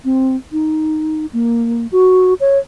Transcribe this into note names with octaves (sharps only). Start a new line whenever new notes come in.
C4
D#4
A#3
F#4
C#5